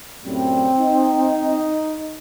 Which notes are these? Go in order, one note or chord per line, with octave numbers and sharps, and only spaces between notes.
F#2 A2 G3 C4
D#4